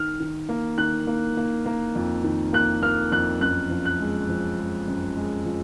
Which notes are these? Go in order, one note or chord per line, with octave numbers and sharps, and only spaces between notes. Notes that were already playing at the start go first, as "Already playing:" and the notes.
Already playing: D#3 F6
D#3
A#3
D#3 F#6
A#3
A#3
A#3
F2
D#3
A#3 F#6
A#3 F6
F2 F#6
F#2 F#6
F3
F#6
G#3
F3
G#3
F#2
G#3
F3